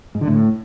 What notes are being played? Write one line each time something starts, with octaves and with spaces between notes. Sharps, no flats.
G#2
D3
A2